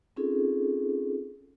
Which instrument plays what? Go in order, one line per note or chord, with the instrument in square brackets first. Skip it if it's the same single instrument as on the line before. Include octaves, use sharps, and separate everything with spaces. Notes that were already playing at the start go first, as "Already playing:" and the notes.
[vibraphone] C4 C#4 D#4 F4 G#4 A4